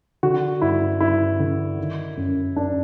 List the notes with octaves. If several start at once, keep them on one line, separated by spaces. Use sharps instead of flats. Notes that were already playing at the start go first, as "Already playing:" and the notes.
D3 F#4
G2 E4
G2 E4
D3
D#3
F#2
F#2 D4